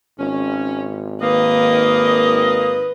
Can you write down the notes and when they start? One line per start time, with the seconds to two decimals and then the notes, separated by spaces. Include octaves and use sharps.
0.19 G#1 C#4
1.22 D#3 A#3 B4 D#5